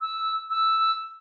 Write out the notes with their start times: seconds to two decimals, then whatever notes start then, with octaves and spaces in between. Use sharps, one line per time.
0.01 E6
0.50 E6